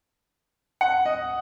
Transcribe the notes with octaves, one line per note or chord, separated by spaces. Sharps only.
F#5
D#5